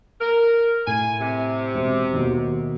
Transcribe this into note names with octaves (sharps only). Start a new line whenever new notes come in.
A#4
A2 G#5
C3
E1 C4
D#2 B2 D#3